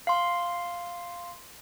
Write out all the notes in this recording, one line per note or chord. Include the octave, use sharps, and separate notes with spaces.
F5 C6